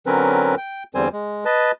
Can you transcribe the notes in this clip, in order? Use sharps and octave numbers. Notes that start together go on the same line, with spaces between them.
D3 F#3 C4 C#4 A#4 B4
G5
E2 D3 G3 C4 C5 G#5
G#3
B4 D#5 A5